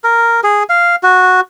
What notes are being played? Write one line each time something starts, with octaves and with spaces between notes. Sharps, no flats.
A#4
G#4
F5
F#4